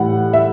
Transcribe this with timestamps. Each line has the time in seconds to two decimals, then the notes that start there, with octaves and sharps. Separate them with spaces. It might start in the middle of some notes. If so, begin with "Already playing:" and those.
Already playing: A2 E3 G3 F#5
0.33 E5